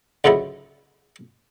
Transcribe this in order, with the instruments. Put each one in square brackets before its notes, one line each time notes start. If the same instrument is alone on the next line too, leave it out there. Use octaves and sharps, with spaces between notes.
[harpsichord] C#2 G#2 D3 F#3 E4